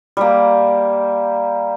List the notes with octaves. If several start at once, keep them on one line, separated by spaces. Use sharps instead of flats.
G3 A#3